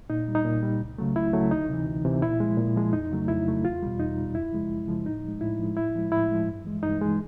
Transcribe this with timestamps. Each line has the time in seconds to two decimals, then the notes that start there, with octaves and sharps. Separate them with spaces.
0.10 A#2 D#4
0.28 G3
0.35 D#4
0.45 A#2
0.63 G3
0.81 C#2
0.98 C#3 F#3 A3
1.16 C#2 E4
1.33 C#3 F#3 A3
1.51 D2 D#4
1.69 C3 E3
1.87 D2
2.05 C3 E3
2.22 A#2 E4
2.40 F3 G#3
2.57 A#2
2.76 F3 G#3
2.93 F2 D#4
3.12 C#3 F#3 A3
3.28 F2 E4
3.46 C#3 F#3 A3
3.64 E2 F4
3.83 B2 G3
3.99 E2 D#4
4.17 B2 G3
4.35 F#2 E4
4.52 C#3 F3 G#3
4.70 F#2
4.88 C#3 F3 G#3
5.06 A2 D#4
5.24 F3 G#3
5.41 A2 E4
5.59 F3 G#3
5.77 A2 E4
5.95 F3 G#3
6.12 A2 E4
6.31 F3 G#3
6.47 G2
6.65 E3 G#3
6.83 G2 D#4
7.01 E3 G#3